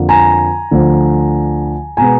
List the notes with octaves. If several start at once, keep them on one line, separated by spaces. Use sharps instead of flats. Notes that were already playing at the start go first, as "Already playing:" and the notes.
Already playing: F2 D3 F3 A#3
G#5 A#5
D2 D3 F3
B2 G#3 B3 G#5 A#5